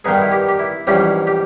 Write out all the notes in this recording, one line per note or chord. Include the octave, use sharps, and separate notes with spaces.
G2 D#3 G3 B3 D#4 G#4
E4
G4
G4
E4
A#1 G#2 E3 G3 C#4 G4
G4